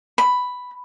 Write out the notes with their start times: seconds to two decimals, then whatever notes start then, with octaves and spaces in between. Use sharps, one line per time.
0.18 B5